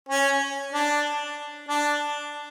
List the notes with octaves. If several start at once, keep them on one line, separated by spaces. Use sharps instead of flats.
C#4
D4
D4